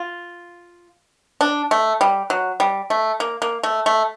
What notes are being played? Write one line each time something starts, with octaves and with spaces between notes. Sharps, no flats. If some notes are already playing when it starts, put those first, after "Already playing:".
Already playing: F4
D4
A3
G3
F#3
G3
A3
A#3
A#3
A3
A3